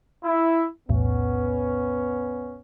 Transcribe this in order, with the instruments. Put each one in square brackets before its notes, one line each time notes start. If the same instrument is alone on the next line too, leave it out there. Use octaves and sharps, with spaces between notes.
[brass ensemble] E4
[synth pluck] B1 E2 A2 [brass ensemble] B3 C#4